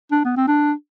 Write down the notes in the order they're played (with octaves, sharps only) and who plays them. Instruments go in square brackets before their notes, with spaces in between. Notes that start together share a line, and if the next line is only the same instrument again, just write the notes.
[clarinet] D4
B3
C4
D4